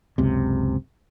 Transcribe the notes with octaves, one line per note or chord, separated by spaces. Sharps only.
F#1 C#2 C3